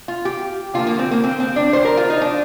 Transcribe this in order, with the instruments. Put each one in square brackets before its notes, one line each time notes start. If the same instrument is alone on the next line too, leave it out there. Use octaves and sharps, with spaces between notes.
[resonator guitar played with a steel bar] F4
G4
D3 F3 A#3 F4
A#3
C4
A#3
C4
C4
D4
C5
A#4
F4
D#4
D4